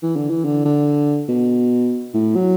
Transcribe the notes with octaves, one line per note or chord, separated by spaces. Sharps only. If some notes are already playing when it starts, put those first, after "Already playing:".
E3
D3
E3
D3
D3
B2
A2
F#3